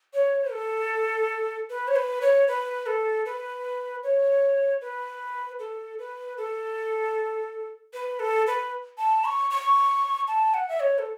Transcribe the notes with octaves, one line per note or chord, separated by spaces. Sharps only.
C#5
A4
B4
C#5
B4
C#5
B4
A4
B4
C#5
B4
A4
B4
A4
B4
A4
B4
A5
C#6
C#6
A5
F#5
E5
C#5
A4